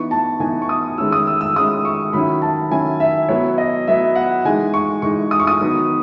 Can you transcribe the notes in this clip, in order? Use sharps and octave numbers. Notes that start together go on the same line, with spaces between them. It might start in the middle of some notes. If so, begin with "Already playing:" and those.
Already playing: E3 B3 D#4 C#6
A5
E3 B3 D#4 G#5
C#6
D#6
D#3 G#3 C#4 E4 E6
D#6
E6
E6
D#3 G#3 C#4 E4 D#6
C#6
D#3 F#3 C#4 E4 B5
A5
D#3 F#3 C#4 E4 G#5
E5
F#3 B3 E4 C#5
D#5
F#3 B3 E4 E5
F#5
E3 G#3 D#4 G#5
C#6
E3 G#3 D#4 C#6
D#6
C#6
D#6
D#3 F#3 B3 D#4